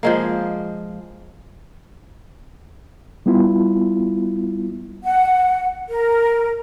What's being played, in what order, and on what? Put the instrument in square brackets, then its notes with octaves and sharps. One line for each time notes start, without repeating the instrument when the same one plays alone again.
[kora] F3 G#3 A#3
[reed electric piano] G3 B3 E4 F4
[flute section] F#5
A#4